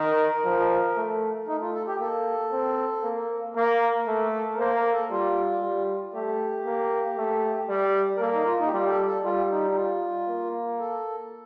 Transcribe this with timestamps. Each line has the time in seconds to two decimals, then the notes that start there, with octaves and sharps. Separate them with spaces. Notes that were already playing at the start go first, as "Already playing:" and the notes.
Already playing: D#3 A#4
0.45 F3
0.96 A3
1.48 A3 D#4
1.62 F4
1.74 A4
1.87 G4
2.00 A#3 A4
2.52 C4
3.03 A#3
3.55 A#3 A#4
4.07 A3
4.54 A#4
4.58 A#3 C5
4.75 A#4
4.93 A4
5.10 G3 F4
5.62 G3
6.13 A3 G4
6.65 A#3
7.17 A3
7.69 G3
8.17 A#4
8.20 A#3 A4
8.34 D#4
8.46 F4
8.60 D#4
8.67 G4
8.72 G3 F4
8.86 G4
8.89 A4
9.06 A4
9.24 G3 F4
9.51 D#4
9.71 D#4
9.76 F4
10.27 A#3
10.80 A4